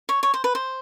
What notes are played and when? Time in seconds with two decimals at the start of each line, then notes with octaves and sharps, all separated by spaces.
0.09 C#5
0.23 C#5
0.34 C5
0.44 B4
0.55 C5